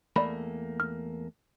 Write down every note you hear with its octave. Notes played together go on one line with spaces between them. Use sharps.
E2 A3 A#3 D5 B5
F6